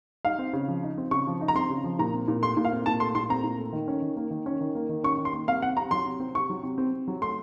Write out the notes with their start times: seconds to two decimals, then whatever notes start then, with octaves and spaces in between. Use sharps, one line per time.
0.25 D#4 F5
0.39 C4
0.53 C#3
0.68 F3
0.83 D#4
0.98 C4
1.11 C#3 C#6
1.27 F3
1.41 D#4
1.48 A#5
1.55 C4 C6
1.70 C#3
1.84 F3
1.99 A#2 A#5
2.13 C4
2.28 A#2
2.42 A3 C6
2.57 A#2
2.65 F5
2.72 C4
2.86 A#2 A5
3.00 A3 C6
3.15 A#2 C6
3.30 C4 A#5
3.44 A#2
3.58 A3
3.73 D#3
3.88 C#4
4.02 D#3
4.16 A#3
4.31 D#3
4.46 C#4
4.61 D#3
4.75 A#3
4.89 D#3
5.03 C#4 C#6
5.18 D#3
5.25 C6
5.33 A#3
5.48 C3 F5
5.62 C4 F#5
5.77 C3 A#5
5.91 F#3 C6
6.06 C3
6.20 C4
6.35 C3 C#6
6.50 F#3
6.63 C3
6.78 C4
6.93 C3
7.08 F#3
7.22 A3 C6